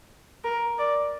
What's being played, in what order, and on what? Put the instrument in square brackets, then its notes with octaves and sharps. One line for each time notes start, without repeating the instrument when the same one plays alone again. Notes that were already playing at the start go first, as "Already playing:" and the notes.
[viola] A#4
D5